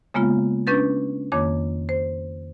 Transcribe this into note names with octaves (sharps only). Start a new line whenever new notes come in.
C#3 G#3 A#3 B3 F4
C#4 D4 B4 G6 A6
F2 D#3 A#3 C#5 D6
C5